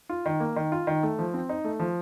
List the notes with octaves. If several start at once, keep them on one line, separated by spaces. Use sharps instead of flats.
F4
D#3
A#3
D#3
F4
D#3
A3
F3
C4
D#4
A3
F3